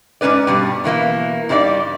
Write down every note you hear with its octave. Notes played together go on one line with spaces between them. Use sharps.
G#2 G#3 C#4 B4 D5
G2 B2 G3
B2 E3 A#3 E4
G2 G3 D4 D#4 D5